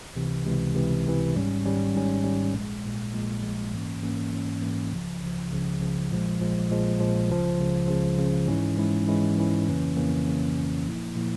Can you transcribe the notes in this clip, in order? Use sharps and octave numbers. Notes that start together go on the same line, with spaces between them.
C#2 C3 E3
C#2 C3 E3
C#2 C3 E3
C#2 C3 E3
G#1 G#2 G3 C#4
G#1 G#2 G3 C#4
G#1 G#2 G3 C#4
G#1 G#2 G3 C#4
A#1 A#2 G#3
A#1 A#2 G#3
A#1 A#2 G#3
A#1 A#2 G#3
G#2 E3 A#3 C#4
G#2 E3 A#3 C#4
G#2 E3 A#3 C#4
G#2 E3 A#3 C#4
C#2 C#3 F3
C#2 C#3 F3
C#2 C#3 F3
C#2 C#3 F3
A#1 A#2 F3 G#3
A#1 A#2 F3 G#3
A#1 A#2 F3 G#3
A#1 A#2 F3 G#3
C#2 C#3 F3
C#2 C#3 F3
C#2 C#3 F3
C#2 C#3 F3
G#2 E3 G#3 C#4 E4
G#2 E3 G#3 C#4 E4
G#2 E3 G#3 C#4 E4
G#2 E3 G#3 C#4 E4
F2 C#3 E3 A#3 C#4
F2 C#3 E3 A#3 C#4
F2 C#3 E3 A#3 C#4
F2 C#3 E3 A#3 C#4
A#2 F3 A#3 E4
A#2 F3 A#3 E4